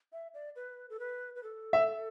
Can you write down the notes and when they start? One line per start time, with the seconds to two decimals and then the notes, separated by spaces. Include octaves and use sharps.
0.12 E5
0.34 D5
0.56 B4
0.90 A4
1.00 B4
1.35 B4
1.43 A4
1.73 E5